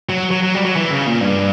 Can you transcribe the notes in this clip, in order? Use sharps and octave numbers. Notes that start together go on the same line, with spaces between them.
F#3
F#3
F#3
G3
F#3
E3
C#3
A#2
G2